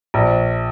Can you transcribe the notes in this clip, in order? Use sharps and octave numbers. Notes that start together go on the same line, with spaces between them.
A#1